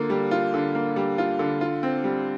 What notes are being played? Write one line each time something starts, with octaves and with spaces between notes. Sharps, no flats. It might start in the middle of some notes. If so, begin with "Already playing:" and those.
Already playing: D3 A#3 F4
G3
F4
D3
A#3
G3
F4
D3
F4
C4
G3